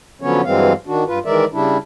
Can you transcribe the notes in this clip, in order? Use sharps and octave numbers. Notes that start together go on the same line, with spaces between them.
D3 F3 F#3 B3 C#4 C#5
G2 E3 F#3 G#3 C4 F5
D#3 D4 F#4
G2 F4 B4
D#3 E3 G#3 A#4 D5 E5
C#3 G3 D4 E4